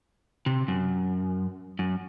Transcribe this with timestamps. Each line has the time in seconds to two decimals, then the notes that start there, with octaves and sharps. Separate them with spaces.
0.46 C3
0.68 F#2
1.79 F#2